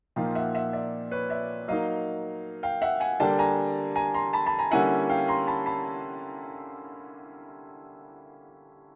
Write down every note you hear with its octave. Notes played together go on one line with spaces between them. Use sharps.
A#2 F3 A#3 D#4 F5 G5
E5 F#5
E5 F#5
D5 E5
B4 C#5
D5 E5
F#3 A#3 D#4 D#5 F5
F5 G5
E5 F#5
F#5 G#5
D3 G3 A#3 D4 G5 A5
G#5 A#5
G#5 A#5
A#5 C6
A5 B5
A5 B5
G#5 A#5
D3 G3 A#3 C#4 E4 F#5 G#5
F5 G5
A#5 C6
A5 B5
A5 B5